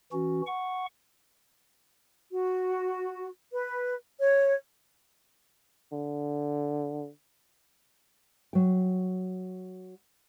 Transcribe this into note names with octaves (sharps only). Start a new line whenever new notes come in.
E3 C#4 F#4
F#5 C#6
F#4
B4
C#5
D3
F#3 G5